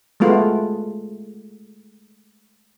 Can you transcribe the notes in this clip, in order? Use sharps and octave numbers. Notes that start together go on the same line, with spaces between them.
G#3 A3 B3 F4 F#4